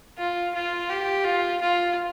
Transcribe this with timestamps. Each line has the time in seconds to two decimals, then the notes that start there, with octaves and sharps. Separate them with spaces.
0.18 F4
0.54 F4
0.89 G4
1.25 F4
1.61 F4